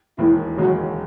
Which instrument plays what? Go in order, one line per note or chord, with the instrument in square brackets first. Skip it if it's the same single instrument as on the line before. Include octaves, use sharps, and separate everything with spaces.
[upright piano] E1 D#2 D#3 G#3 [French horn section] E4
[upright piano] E1 D#2 C#3 G#3 [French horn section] F#3